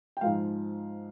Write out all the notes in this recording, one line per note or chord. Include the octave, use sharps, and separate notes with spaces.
G5
G#2 F3 G#3 F5